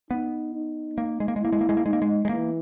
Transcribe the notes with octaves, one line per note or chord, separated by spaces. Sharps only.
B3 D#4
D#4
A#3
G#3
A#3
G#3
A#3 E4
G#3
A#3
G#3
A#3
G#3 D#4
A#3
G#3
G#3
E3 A#3